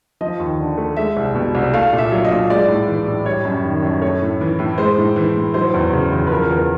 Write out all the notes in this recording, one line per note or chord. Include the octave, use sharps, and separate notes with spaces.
F3 D#5
D#2
D3
A3
G#3 E5
C2
B2
C2
A3 F5
A#2
E5
F#3
D#5
A#2
G#3 D5
A2
E3
A2
G3 C#5
F#2
D#3
F#2
A3 C#5
A2
E3
A2
G#3 C5
A2
E3
A2
F#3 C5
E2
C#3
E2
B4
F3 A#4
E2 A#4